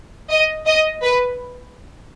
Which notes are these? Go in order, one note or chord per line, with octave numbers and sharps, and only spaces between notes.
D#5
D#5
B4